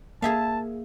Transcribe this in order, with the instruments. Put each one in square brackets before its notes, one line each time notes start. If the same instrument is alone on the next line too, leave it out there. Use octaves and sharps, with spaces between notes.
[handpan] A#3 [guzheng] G#4 E5 F5 [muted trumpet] A5